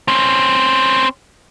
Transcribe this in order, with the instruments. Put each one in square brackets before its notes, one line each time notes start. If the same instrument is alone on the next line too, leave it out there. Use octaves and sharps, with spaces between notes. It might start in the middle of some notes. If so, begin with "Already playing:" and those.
[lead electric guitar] C4 C#4